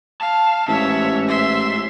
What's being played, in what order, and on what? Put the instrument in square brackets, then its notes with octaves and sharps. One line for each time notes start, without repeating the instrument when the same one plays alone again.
[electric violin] F5 [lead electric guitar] A5
[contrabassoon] A1 [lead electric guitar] G#2 [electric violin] C#5 E5
[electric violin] E5 C6